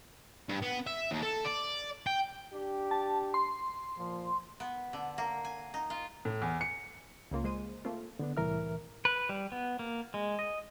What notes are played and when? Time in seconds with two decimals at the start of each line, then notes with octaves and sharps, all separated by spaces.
0.49 G2
0.62 B3
0.87 E5
1.11 D#2
1.23 A4
1.45 D5
2.07 G5
2.53 D4 G4
2.91 A5
3.34 C6
3.97 A#2 F3
4.60 B3
4.93 D3
5.18 A#3
5.45 G#5
5.74 D#4
5.90 F4
6.25 A2
6.42 E2
6.61 C#7
7.31 C#2 C#3 A#3 F4
7.44 G#3 C5 D#7
7.85 A3 A#3 C4 F4
8.19 D3 B3 D4
8.37 C2 A2 E3 A#4 E5 F6
9.05 B4
9.29 G3
9.52 B3
9.79 A#3
10.14 G#3
10.39 D#5